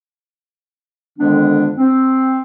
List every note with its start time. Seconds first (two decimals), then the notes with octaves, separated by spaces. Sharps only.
1.19 F2 D3 D#3 G#3 B3 D4
1.77 C4